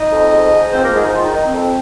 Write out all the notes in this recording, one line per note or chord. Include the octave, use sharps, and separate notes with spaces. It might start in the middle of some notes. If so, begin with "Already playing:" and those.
Already playing: D#4 D#5
F2
G#2
G#2
F3 C4 C5
A#3 A#4
G#2 G#3 G#4
D#4
D#3 F3 F4
D#4
D#3 D#4
C4
F2